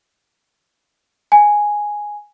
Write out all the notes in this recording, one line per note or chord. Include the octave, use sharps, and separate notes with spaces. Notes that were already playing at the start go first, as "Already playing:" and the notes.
G#5